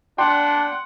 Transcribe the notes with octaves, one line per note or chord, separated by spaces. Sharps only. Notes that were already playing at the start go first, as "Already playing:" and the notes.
D4 F#5 G5 C6 F#6